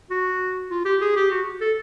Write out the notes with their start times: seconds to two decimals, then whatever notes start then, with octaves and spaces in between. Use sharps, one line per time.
0.10 F#4
0.71 F4
0.85 G4
1.01 G#4
1.16 G4
1.31 F#4
1.61 A4